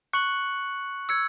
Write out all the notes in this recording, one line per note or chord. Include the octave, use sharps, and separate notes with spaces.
C#6 F#6 C#7 F#7
E6 G#6 C#7